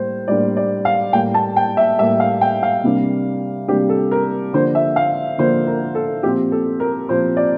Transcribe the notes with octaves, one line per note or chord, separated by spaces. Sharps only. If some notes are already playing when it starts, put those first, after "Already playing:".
Already playing: A2 G3 A#3 C5
A2 G3 A#3 D4 D5
D5
F5
A2 G3 A#3 G5
A5
G5
E5
A2 G3 A#3 E5
F5
G5
F5
C3 G3 A#3 D4
C3 G3 A#3 D4 G4
A4
A#4
D3 F3 A#3 D4 C5
E5
F5
D3 F3 A#3 D4 C5
A#4
A4
A#2 F3 C4 G4
A4
A#4
A#2 F3 C4 C5
D5